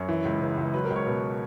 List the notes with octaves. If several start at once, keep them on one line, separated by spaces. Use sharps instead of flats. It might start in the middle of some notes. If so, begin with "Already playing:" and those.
Already playing: F#2 C#5
E3
C#2
C#3 B4
C#2
F#3 B4
A#4
C#2
C#5
B2 B4